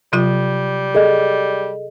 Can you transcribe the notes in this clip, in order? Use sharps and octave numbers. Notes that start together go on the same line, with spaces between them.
C3 F#3 G3 F4
G#4 A4 D#5